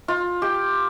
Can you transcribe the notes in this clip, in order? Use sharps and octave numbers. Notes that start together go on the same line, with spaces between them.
F4
G4